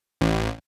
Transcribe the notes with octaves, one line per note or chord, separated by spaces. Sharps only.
A1